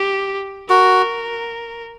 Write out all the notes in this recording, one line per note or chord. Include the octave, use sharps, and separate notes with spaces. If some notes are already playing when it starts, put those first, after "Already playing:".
Already playing: G4
F#4 A#4